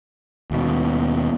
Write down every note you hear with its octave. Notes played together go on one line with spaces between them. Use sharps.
D#2 B2